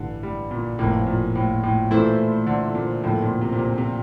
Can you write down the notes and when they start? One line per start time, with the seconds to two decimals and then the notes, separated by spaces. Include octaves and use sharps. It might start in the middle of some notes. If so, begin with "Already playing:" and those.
Already playing: A1 G2 D3 E3
0.23 G3
0.51 A#2
0.79 G1 F2 A2 C3 F3 A#3
1.07 A#2
1.35 A2
1.63 A2
1.91 A#2 E3 A3 E4 A4 C5
2.47 D3
2.75 A#2
3.03 F2 A2 D3 F3 A#3
3.23 A#2
3.41 C3
3.53 A#2
3.59 C3
3.78 C3